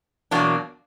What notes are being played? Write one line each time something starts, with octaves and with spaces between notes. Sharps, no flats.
E2 B2 F#3 A#3 D4